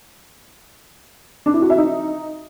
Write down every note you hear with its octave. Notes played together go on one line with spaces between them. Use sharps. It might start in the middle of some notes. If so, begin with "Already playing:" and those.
D4
E4
F#4
E5
D#4